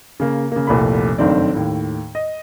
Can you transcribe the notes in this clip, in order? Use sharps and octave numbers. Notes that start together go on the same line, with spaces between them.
C#3 A#3
C#3 A#3
F1 C2 A#2 A3 B5
F#1 G2 D#3 A3 C4 D5
D#2 A2
D#5